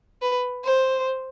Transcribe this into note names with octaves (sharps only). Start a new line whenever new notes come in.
B4
C5